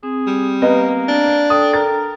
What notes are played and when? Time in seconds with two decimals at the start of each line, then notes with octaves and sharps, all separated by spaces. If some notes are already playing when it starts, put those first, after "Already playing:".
0.03 C4 G#4
0.27 G3
0.62 A#3 B3 D#5
1.08 D4
1.50 A4 G5 D#6
1.73 A#4 A6